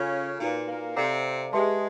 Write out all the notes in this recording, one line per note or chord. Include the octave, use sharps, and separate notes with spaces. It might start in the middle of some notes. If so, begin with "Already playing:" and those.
Already playing: C#3 C#4 F4 A4 C#5 F5
A#2 A#3 D#4 F#4 B4
A#2 A#3
C3 C4 A4 D5 F5 A#5 D6
G#3 G4 B4 E5 A5 C6